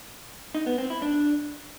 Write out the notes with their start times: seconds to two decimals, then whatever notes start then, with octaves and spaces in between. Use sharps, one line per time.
0.55 D#4
0.66 B3
0.78 C4
0.90 E4
1.02 D4